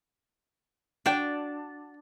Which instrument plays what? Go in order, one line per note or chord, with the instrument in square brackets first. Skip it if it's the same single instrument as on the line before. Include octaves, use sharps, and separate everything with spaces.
[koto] D4 [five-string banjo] F#4 G5